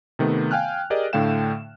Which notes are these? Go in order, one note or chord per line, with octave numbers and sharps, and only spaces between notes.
C3 D#3 A3 B3
F5 G5 G#5 F6 F#6
G4 G#4 A#4 D5 D#5
A2 D3 A3 F5 G5 E7